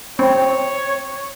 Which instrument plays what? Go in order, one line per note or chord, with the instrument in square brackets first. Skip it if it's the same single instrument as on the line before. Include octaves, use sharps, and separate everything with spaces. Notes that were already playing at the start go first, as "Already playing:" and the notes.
[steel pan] C4 [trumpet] C#5